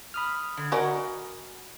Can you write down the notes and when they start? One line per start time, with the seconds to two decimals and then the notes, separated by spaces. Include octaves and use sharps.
0.14 B5 D#6 F6
0.57 D3
0.72 F#4 A#4 D5 D#5 F#5 G#5 A#5